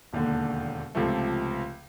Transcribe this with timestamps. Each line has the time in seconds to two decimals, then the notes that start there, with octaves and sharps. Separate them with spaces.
0.13 E1 D#2 D3
0.95 C#2 C3 F3 A3